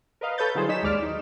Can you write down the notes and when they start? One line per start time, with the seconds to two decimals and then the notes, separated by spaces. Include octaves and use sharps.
0.21 A#4 B4 D#5 F5
0.38 A4 B4 C#5 G6 A6
0.55 D3 F#3 G3 E4 G#4 C5
0.69 D#4 C#5 B6 E7
0.82 A#1 D#2 G#3 D5 D6 F6
1.02 D#4